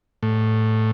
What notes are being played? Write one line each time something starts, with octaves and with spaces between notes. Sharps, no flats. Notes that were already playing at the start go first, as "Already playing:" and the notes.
A2